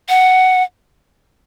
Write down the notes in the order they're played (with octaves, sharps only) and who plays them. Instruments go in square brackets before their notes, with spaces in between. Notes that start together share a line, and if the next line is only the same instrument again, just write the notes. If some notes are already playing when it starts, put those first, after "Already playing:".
[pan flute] F#5